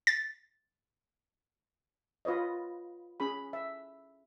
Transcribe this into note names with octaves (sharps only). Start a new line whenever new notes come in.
A6
F4 B4 C#5 D#5
C#4 G#4 B5
E5